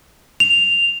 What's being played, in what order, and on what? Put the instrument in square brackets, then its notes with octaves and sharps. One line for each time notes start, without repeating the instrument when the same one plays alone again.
[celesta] F7